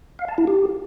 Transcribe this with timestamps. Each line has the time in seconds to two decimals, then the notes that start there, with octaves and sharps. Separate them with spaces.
0.19 F5
0.28 A5
0.38 E4
0.47 G4